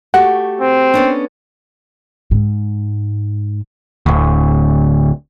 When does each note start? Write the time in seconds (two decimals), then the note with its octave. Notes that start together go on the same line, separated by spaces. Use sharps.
0.14 A3 F#4 G4 F#5
0.61 C4
0.94 B3 C#4 D4
2.31 G#2
4.06 D1 D2